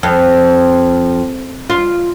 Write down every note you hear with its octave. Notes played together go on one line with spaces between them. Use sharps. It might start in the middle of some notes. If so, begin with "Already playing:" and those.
F2
F4